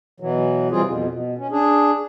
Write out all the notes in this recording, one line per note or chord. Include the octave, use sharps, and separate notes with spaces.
B2 E3 F#3
C3 E3 G3 C4 F4 G#4
F2 B2
B2
C#4
D4 G#4